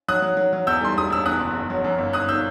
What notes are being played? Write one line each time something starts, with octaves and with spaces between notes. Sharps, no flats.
F#3 D#6 F#6
F#3
F#3
F#3
E2 E6 G6
G3 C6
E1 D#6
E1 E6
E2 D#6 F#6
F#1
F#1
F#3
F#2
G1
G1 D#6 F#6
E6 G6